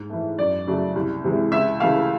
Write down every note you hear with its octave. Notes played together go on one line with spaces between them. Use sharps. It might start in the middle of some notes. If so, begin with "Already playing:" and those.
Already playing: G#2
E3 A3
F#2 D5
C#3 F#3 A3
C2
C3 E3 G#3
C#2 E5
C#3 E3 A3 F5